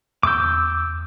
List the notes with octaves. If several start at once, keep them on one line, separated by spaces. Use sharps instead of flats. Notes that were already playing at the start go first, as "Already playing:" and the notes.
E2 D6 E6 G6